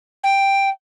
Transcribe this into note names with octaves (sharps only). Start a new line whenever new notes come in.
G5